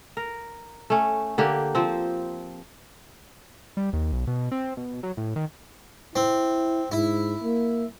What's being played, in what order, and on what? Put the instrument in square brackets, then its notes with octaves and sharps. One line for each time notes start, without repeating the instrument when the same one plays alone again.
[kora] A#4
A3 C#4
D3 A#3 G4
F3 C4
[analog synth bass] G3
D#2
B1
B2
C4
B2
F#3
A2
D#3
[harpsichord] C4 [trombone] E4
[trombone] G#2 [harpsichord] E4
[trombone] A#3